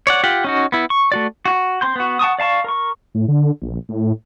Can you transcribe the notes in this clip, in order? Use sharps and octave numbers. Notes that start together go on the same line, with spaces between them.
C#5 D5 F#5
F4 G4 F#5
C#4 D#4 F#4
B3 E4
C#6
A3 F#4 D5
F#4
C4 C6 G6
B3 F#4
F#5 A5 C#6 D#6
D5 F5 A5 C#6
A#4 C#6
A2
D3
A#1
A2